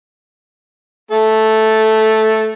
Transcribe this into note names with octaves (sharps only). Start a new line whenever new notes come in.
A3 A4